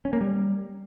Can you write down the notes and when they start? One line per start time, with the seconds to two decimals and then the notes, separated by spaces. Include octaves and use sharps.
0.05 C#4
0.13 A#3
0.21 G3